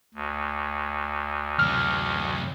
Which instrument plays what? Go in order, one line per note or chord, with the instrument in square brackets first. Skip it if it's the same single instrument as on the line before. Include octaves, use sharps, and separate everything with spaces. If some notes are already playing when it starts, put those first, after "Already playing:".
[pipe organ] D2
[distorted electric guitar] F#2 C3 [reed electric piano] F6